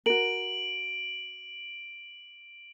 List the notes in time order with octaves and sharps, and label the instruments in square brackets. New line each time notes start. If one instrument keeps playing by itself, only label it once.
[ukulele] F#4 A#4 [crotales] D7 F#7